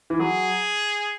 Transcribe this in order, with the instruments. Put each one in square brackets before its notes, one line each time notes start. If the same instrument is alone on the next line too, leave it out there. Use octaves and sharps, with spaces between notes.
[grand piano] E3
[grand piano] F#3 [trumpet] G#4